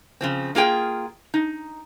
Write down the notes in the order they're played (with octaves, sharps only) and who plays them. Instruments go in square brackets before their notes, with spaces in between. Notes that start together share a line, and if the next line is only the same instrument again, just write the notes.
[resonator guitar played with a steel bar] C#3 F3 C4
A#3 F4 G#4 G5
D#4